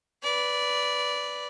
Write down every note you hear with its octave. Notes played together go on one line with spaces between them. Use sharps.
B4 D5